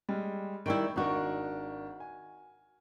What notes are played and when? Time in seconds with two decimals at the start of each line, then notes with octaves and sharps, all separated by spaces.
0.09 G3 G#3
0.66 D#3 G3 E4 G5 C#6 D7
0.96 G#1 D4 D#4 F#4 A#4
2.00 G#5